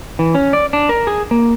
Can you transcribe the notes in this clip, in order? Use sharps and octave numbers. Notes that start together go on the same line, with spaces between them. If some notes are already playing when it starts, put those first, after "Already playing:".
E3
C#4
D5
D4
A#4
G#4
A#3